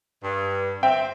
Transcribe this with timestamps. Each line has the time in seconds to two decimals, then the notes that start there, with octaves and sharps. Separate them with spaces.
0.23 G2
0.83 C4 E5 G5